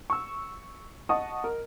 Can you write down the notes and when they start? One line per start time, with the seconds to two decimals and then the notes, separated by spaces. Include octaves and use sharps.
0.10 C#6 E6
1.09 D#5 F#5 A5 C#6 D#6
1.44 A#4